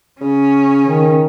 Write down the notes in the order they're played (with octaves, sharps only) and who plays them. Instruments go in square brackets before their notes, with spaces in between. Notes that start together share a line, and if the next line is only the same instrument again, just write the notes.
[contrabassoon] C#3 [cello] C#4
[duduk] D#3